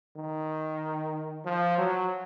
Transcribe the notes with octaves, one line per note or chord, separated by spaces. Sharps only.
D#3
F3
F#3